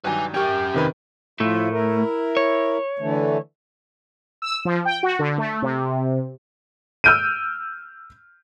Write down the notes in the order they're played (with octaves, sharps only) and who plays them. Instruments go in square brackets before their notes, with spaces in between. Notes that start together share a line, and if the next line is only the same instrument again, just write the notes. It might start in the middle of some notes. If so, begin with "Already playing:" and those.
[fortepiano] G2 D#3 F#3 [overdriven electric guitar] B4 G#5
[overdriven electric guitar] C#4 A#4 [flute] G4 [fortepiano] G5 C#6
[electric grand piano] C3 D#3 B4
[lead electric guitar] A2 A3 [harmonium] F3 E4 F4
[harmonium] E4 A#4
[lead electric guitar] C#5
[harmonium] D3 E3 A3
[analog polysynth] E6
F3
G5
F#4
D3
A3
C3
[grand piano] E6 F6 G6 D7 D#7